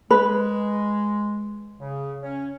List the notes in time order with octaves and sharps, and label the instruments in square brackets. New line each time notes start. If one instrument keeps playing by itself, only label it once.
[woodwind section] G#3 [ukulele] B4
[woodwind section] C#3
C#4